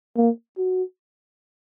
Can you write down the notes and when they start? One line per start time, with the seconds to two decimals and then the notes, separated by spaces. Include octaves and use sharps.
0.16 A#3
0.58 F#4